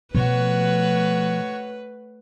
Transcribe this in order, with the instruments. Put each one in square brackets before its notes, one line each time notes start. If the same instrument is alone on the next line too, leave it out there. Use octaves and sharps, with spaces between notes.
[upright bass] B2 F3 [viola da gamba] A3 B4 [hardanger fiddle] F#4 C#5